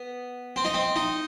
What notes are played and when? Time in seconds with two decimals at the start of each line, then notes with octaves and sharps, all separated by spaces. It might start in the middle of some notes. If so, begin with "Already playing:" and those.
Already playing: B3
0.56 C4
0.65 D#4
0.74 C4
0.96 D#4